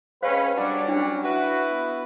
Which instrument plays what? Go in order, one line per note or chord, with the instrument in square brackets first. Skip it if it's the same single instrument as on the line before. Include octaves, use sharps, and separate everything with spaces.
[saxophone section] C3 G#3 C#4 [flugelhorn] B4 [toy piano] C5 F5
[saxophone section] F#3 G3 [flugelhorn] D4
[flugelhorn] C#4 [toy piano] D4
[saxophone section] E4 B4 [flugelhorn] F#4
[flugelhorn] B3